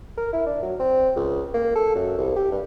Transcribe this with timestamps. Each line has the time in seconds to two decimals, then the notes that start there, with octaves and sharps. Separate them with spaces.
0.17 A#4
0.33 E4
0.46 D4
0.63 F#3
0.80 C4
1.16 C#2
1.54 A#3
1.75 A4
1.95 F#2
2.18 C2
2.36 G4
2.52 G2